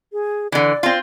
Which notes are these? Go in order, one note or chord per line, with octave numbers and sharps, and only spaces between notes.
G#4
D3 E3 D5
C4 F4